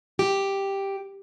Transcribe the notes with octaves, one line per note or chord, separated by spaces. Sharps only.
G4